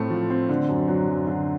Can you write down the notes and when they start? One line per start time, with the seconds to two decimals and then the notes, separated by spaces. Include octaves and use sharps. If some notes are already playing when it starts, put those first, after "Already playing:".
Already playing: A2 A3 C4
0.10 F3
0.30 C4
0.49 D3
0.69 F#2
0.88 F#3
1.08 F#2
1.27 D3